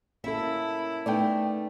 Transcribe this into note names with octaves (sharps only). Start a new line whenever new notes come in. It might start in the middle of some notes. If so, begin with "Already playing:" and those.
A#3 C#4 E4 A4 E5
A3 B3 D#4 D5 G5